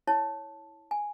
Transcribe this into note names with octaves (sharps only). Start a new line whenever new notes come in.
E4 C#5 A5
G#5